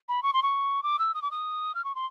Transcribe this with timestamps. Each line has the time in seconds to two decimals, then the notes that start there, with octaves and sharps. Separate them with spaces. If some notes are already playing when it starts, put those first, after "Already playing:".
0.09 B5
0.23 C#6
0.33 C6
0.43 C#6
0.83 D6
0.99 E6
1.14 D#6
1.22 D6
1.31 D#6
1.75 F6
1.84 C#6
1.95 C6